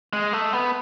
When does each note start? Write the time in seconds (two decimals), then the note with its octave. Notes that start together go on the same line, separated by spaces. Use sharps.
0.13 G#3
0.33 A3
0.53 B3